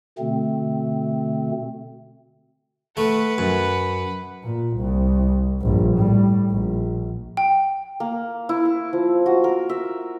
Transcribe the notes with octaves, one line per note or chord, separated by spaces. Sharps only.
B2 D3 A3 C4
A3 B4 F#5
F#2
A#2
C2
A#1 G2
A2 G3
A#1
G5
A#3
E4
C#6
F3
F#4
A#4
E5